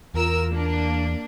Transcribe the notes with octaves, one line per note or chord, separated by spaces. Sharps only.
E2 F4 A#4 E6
A#3 D4